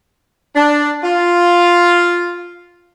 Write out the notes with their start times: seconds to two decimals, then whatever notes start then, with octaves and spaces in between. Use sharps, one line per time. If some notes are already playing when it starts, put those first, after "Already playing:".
0.55 D4
1.03 F4